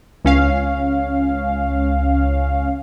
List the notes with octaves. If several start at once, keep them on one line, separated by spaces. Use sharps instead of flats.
C#2 C#4 F5